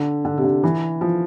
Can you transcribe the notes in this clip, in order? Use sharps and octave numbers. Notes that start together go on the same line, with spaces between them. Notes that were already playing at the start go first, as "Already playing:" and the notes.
Already playing: D3
D3
C3
D3
E3
F3